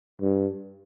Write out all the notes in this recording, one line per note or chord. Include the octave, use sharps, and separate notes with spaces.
G2